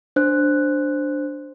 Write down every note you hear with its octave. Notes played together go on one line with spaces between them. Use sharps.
D4 C5 F#6